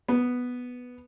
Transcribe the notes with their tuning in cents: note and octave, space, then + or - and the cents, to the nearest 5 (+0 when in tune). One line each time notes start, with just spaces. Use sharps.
B3 +0